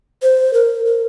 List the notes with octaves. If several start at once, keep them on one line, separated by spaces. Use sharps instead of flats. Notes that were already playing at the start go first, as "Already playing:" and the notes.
C5
A#4
A#4